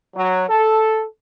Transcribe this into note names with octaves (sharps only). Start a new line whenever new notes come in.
F#3
A4